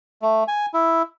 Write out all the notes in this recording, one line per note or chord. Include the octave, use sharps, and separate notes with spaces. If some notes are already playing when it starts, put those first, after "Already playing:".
A3
G#5
E4